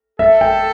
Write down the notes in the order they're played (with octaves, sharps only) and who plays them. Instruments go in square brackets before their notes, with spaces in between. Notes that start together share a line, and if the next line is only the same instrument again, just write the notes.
[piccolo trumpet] A4 [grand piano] E5
[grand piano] G5